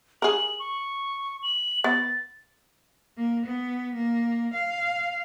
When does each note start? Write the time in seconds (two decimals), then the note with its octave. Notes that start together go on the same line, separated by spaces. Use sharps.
0.22 G#4 A#4 F#7
0.60 C#6
1.43 F#7
1.84 B3 A6
3.17 A#3
3.46 B3
3.95 A#3
4.54 F5